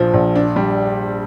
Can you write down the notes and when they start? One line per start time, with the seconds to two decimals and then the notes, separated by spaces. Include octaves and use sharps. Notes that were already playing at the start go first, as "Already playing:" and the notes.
Already playing: A#1 F3
0.14 A#1
0.36 D4
0.56 G3